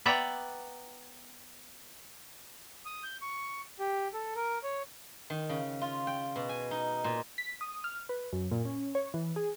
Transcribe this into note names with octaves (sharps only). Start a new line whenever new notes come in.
B3 B4 D5 E5 G5 A#5
D#6
G6
C#6
G4
A4
A#4
C#5
D#3
C#3
F4
G5
B2
G#5
D#4
A#2
B6
D#6
F6
B4
F#2
A#2
C#4
C#5
E3
G#4